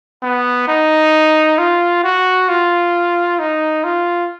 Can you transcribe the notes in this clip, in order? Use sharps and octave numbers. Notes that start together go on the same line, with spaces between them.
B3
D#4
F4
F#4
F4
D#4
F4